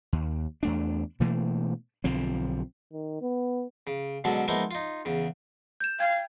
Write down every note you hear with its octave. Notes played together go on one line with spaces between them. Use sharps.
D#2
E2 A3 D4
B2 E3 A3 A#3
B1 D3 F3 C4
D#3
B3
C#3
B2 D3 F#3 G#3 C#4 A4
F3 G#3 A#3 B3 D#4 E4
D#4 F4
E2 C#3
G6 E7
F5 G5 G#6